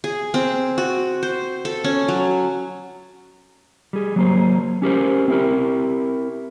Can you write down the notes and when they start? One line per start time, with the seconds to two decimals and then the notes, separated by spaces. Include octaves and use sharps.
0.04 G#4
0.34 C4
0.78 F#4
1.23 C5
1.65 A4
1.84 C#4
2.08 F#3
3.93 G3 G#4
4.16 F#3 A#3 C5
4.82 C#4 G4 A#4 C5
5.28 C4 E4 G4 A#4